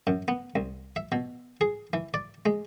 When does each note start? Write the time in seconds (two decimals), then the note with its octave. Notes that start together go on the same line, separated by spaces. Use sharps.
0.07 F#2
0.28 B3
0.56 C2
0.96 E5
1.12 B2
1.61 G#4
1.93 E3
2.14 D5
2.46 G#3